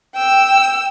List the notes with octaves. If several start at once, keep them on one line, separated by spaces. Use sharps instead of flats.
G5 E6